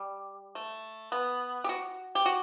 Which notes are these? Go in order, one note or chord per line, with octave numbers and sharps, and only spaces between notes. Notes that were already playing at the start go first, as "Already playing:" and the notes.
Already playing: G3
A3
B3
G4
F#4
G4
F#4